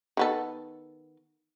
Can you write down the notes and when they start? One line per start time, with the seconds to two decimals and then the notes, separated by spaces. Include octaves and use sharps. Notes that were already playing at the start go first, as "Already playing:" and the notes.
0.17 D#3 B3 A4